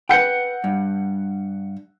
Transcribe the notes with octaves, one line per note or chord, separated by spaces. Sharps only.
B4 F#5 G5 G6 C#7
G2